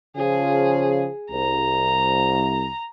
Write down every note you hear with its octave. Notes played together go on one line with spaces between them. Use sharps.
C#3 F3 G#4
C2 A#5